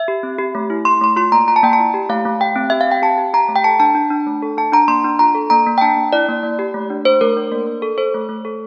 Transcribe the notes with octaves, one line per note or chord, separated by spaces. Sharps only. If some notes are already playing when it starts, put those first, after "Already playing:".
Already playing: E5
G4
C4
G4
A3
E4
A3 C6
A3 C6
F4 C6
A#3 A#5
F4 A#5
A5
A#3 G5
A5
E4
G4
A3 F5
A3
G4 G5
C4
G4 E5
F5
C4 G5
G4 A5
G4
G4 A#5
A3
G5
A4 A5
D4 A5
D4
D4
A3
A4
D4 A5
D4 A#5
A#3 C6
D4
F4 A#5
A4
A#3 A#5
A#3
G5
D4 A5
A#3
E4 D5
A#3
A#3
G4
A3
D4
A3 C5
A3 A#4
D4
A#3
A#3
A4
A4 C5
A3
A3
A4